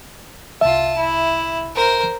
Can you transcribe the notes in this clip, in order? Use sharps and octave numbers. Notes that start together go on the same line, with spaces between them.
C2 F4 E5 A5
E4
A#4 C5